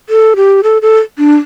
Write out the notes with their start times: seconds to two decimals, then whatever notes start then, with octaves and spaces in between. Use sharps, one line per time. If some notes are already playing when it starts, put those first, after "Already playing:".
0.09 A4
0.36 G4
0.63 A4
0.82 A4
1.18 D4